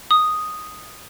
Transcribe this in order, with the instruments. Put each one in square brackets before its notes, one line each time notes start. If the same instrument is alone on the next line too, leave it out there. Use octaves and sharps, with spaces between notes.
[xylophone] D#6